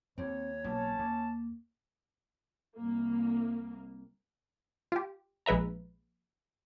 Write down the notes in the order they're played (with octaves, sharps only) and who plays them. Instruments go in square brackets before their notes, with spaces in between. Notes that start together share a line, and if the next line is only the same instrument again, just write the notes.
[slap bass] D#2 [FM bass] C4 [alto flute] C#5
[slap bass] B1 A#3 [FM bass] B2 [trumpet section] C#4 A5
[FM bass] D#2 [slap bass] A#3
[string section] C2 A#3
[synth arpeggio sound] F4 G4
A#1 G#3 B4 E5 A#5